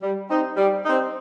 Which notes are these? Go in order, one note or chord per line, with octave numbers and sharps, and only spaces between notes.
G3
C4 D#4
G3
C4 D#4